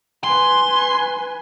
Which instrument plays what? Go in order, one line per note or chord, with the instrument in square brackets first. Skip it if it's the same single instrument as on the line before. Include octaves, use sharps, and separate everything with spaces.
[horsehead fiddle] B4 G#5 [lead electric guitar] C6